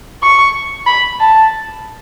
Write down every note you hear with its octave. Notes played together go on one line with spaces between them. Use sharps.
C#6
B5
A5